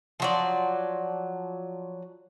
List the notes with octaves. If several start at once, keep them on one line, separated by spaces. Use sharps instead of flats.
F3 F#3 D5